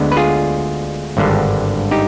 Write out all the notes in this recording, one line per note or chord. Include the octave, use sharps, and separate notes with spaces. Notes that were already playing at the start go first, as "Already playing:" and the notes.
Already playing: D2 D3 G#3 B3
B4
F4 G#4
G#1 G2 D3
D#4 G4